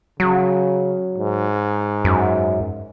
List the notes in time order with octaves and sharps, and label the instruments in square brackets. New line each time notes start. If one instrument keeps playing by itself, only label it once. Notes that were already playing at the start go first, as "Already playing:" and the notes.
[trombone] C#3 [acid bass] F#3
[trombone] G#2
[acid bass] F#2